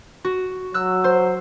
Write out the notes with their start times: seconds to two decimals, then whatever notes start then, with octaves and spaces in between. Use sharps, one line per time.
0.25 F#4
0.74 F#3 E6 F#6
1.04 C5